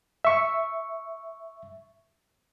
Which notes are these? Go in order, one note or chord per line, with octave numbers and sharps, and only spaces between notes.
E5 C#6